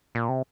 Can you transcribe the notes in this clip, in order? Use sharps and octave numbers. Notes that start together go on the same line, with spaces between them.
A#2
C3